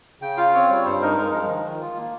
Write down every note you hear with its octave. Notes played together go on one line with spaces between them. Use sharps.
C#3 G5
F4 F5
C4 C#5
G3 C#5
G2 C5
D#4 A#4
G#3 A#4
F3
D#3
D#3
F4
A#3